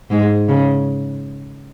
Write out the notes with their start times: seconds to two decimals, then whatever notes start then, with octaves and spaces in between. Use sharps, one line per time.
0.10 G#2 G#3
0.48 C#3